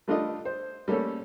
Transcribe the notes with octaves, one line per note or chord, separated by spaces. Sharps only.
G3 A3 D4 F4 A4 D#5
C5
G3 A3 A#3 C#4 A4